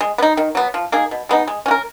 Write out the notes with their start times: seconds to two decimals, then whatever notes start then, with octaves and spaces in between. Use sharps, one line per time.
0.01 G#3
0.18 B3
0.22 D#4
0.37 D#3
0.55 F#3 B3
0.74 F3
0.92 A#3 D#4 G#4
1.11 B2
1.29 G#3 B3 D#4
1.48 G#3
1.66 C#4 F#4
1.71 A#4